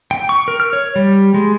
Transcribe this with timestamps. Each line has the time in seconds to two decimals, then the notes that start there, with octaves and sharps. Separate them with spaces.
0.11 G5
0.29 C#6
0.48 A#4
0.60 F6
0.73 C#5
0.96 G3
1.34 G#3